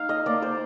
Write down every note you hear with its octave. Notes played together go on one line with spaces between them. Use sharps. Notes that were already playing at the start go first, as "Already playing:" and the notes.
Already playing: D#4 F5
D#5
A#3 D5
C5